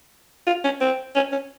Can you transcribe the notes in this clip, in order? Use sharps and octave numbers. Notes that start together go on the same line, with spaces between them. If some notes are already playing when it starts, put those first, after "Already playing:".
F4
C#4
C4
C#4
C#4